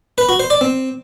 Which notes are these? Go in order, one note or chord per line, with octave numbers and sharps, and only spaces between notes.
B4
F#4
C5
D5
C4